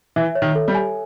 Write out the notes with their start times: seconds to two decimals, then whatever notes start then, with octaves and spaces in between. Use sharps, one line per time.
0.16 E3 E5
0.35 C#5
0.42 D#3
0.55 A4
0.68 G3
0.75 G#5